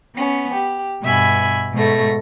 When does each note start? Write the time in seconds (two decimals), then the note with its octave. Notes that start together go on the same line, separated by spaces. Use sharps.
0.15 B3 C#4
0.52 G4
1.02 G2 B2 E5 G#5 B5
1.73 G#2 B2 A3 A#6